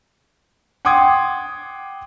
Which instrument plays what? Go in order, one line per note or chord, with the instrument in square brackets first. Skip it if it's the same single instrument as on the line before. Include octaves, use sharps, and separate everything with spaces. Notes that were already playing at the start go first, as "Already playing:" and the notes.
[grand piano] F#5 G5 C6 D6 D#6 G#6